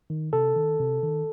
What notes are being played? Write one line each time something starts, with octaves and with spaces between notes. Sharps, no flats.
D#3
C3 A4
D#3
C3
D#3